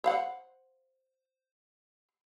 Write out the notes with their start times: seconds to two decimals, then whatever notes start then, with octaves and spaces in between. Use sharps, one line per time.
0.04 C5 F5 F#5